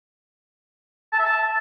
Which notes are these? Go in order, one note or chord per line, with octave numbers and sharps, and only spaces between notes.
A5
E5
A5